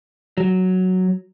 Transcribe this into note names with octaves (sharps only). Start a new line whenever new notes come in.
F#3